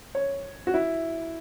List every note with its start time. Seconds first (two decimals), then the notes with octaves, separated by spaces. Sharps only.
0.15 C#5
0.67 F#4
0.74 E4